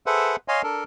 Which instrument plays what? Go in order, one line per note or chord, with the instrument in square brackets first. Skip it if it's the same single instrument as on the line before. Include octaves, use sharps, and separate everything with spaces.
[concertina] G#4 A4 B4 C5 E5 F#5
C#5 D#5 F5 G#5 C6
D4 A4 A#4